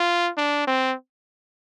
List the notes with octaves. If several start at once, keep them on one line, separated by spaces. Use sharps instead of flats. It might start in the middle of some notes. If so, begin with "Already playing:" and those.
Already playing: F4
D4
C4